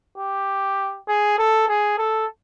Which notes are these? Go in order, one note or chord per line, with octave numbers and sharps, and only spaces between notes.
G4
G#4
A4
G#4
A4